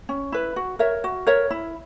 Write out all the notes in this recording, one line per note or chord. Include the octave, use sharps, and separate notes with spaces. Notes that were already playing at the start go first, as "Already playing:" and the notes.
C#4
E4 B4
F#4
A#4 C#5 E5
F#4
A#4 C#5 E5
E4